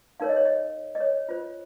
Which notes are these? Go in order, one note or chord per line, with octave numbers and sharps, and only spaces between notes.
D#4 A#4 C#5 F5
D#5
C#5
D#5
D#5
C#5
F4 C5